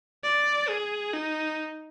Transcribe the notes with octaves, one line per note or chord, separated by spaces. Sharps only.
D5
G#4
D#4